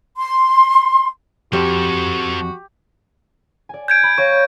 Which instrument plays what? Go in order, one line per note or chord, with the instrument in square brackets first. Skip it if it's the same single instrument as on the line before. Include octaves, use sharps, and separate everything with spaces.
[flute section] C6
[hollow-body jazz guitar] F2 [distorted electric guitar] F3 A4 [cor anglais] F#4 [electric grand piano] G4
[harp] D5 G#5
[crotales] G6 G#6 D7
[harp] B5
[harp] C#5 F5 A#6 [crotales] C#6